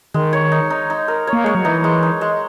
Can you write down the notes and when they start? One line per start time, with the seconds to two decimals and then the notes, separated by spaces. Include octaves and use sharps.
0.14 D#3 G#3
0.33 C#5
0.52 D#4
0.70 D#4
0.90 D#4
1.08 A#4
1.27 C#5
1.33 A#3
1.44 G#3 C#5
1.55 F#3
1.65 E3 D#4
1.84 G#3
2.03 D#4
2.21 G#3